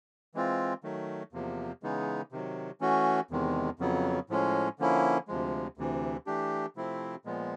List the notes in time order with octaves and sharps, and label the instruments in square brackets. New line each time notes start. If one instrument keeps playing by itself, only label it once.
[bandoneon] E3 G#3 C4 F4
D#3 F#3 A3
E2 C3 F3 A#3
C#3 E3 G#3 B3 D#4
C3 D#3 F#3
E3 A3 C#4 F#4
E2 C3 D#3 G#3
F2 C#3 F#3 B3
A2 F3 G#3 C#4
D3 F3 A#3 C#4 E4
D2 C3 F3 G#3
D2 C3 E3
E3 A3 D4 G4
C3 F3 A3 C4 E4
A#2 F3 G#3 B3